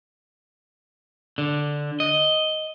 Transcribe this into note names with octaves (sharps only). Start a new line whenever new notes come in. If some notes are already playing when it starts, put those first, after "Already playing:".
D3
D#5